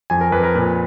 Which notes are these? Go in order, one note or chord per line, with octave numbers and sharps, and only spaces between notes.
F2 G#5
A#4
F2 B4
A#4
A#2 B4